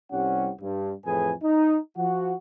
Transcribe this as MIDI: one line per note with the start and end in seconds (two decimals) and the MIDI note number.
0.12 0.51 36
0.12 0.51 48
0.12 0.51 55
0.12 0.51 61
0.12 0.51 78
0.61 0.93 43
1.07 1.32 41
1.07 1.32 45
1.07 1.32 52
1.07 1.32 68
1.07 1.32 71
1.07 1.32 80
1.43 1.78 63
1.97 2.34 53
1.97 2.34 66
1.97 2.34 78